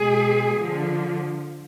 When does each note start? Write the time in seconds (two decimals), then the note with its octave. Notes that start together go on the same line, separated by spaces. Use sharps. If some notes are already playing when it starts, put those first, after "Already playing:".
Already playing: B2 G#3 G#4
0.57 D3 F3